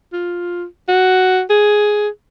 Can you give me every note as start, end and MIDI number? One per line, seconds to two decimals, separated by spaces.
0.13 0.64 65
0.88 1.41 66
1.50 2.08 68